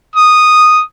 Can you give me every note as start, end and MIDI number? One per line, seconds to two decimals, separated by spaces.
0.15 0.80 87